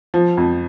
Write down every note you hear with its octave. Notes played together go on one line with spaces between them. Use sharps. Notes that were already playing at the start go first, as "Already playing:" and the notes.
F3
F2